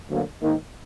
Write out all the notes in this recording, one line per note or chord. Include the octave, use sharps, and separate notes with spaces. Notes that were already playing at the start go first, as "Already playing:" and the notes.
D2 D3 F#3 A#3
G#2 D#3 A#3 D#4